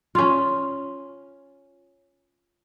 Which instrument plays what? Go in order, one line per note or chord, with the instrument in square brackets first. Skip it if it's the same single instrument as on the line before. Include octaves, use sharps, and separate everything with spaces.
[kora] C#4 F4